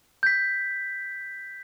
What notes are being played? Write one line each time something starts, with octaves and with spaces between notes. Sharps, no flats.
G6 B6